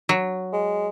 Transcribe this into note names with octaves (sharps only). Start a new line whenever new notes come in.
F#3
G#3